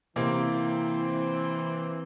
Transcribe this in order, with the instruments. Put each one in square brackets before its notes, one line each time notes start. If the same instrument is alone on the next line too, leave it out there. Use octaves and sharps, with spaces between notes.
[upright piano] C3 A#3 [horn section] E3 C4